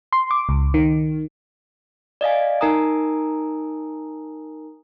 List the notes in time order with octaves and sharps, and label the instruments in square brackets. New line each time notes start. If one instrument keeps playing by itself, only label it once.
[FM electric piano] C6
D6
C#2
D#3
[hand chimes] D5 D#5 F5 G#5
D#4 A#4 G#5 A#5 D#6